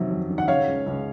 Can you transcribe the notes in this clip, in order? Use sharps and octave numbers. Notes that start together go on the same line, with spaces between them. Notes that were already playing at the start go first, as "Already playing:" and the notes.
Already playing: F2 C3 D#3 F#3
F2
D#3
F#5
C#3 C#5 F5
C#2
C#2